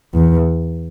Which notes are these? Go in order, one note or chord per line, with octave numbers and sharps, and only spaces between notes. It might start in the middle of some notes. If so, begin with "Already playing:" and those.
E2